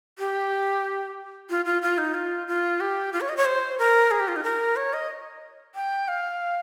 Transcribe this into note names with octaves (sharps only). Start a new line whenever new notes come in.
G4
F4
F4
F4
D#4
F4
F4
G4
F4
C#5
D#5
C#5
C5
A#4
G#4
G4
F4
D#4
A#4
C#5
D#5
G5
F5